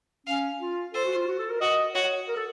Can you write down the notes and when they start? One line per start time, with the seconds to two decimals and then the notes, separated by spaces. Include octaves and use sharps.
0.27 C#4 F5
0.60 F4
0.94 A4 C5
1.05 F#4
1.16 F4
1.28 F#4
1.39 A4
1.50 A#4
1.61 F#4 D#5
1.94 F#4 C#5
2.28 A#4
2.36 A4